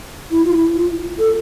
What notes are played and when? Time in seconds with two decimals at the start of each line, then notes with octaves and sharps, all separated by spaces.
0.31 E4
0.44 F4
0.57 E4
0.75 F4
1.19 A4